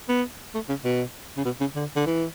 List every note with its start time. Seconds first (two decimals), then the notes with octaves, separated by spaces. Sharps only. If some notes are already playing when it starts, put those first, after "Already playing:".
0.09 B3
0.54 A3
0.69 C#3
0.84 B2
1.37 C#3
1.45 B2
1.60 C#3
1.76 D3
1.96 D3
2.06 E3